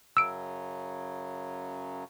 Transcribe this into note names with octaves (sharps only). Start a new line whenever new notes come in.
F#2 C#3 F#3 E6 D7